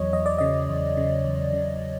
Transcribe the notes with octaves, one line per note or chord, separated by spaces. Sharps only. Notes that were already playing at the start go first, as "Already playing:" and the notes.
Already playing: E2 F#3 C#5 D#5
E2 D#5
D5
C#3 D#5
E2
C#3
E2
C#3